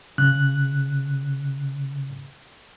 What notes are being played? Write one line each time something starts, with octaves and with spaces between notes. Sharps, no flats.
C#3 F#6